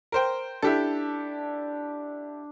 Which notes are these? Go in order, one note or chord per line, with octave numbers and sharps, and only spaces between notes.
A#4 C5 G5
D4 E4 G4 A4